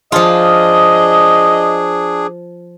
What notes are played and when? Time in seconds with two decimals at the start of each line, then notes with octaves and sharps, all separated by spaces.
0.12 F3 D4 F4 G#4 D#5